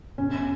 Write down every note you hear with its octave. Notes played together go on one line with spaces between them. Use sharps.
E1 C#4